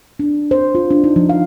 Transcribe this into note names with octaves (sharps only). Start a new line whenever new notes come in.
D4
C5
F4
D4
D#4
F3
F5